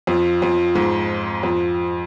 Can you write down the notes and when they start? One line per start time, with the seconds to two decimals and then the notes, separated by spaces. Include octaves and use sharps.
0.07 F2
0.42 F2
0.75 G#2
1.43 F2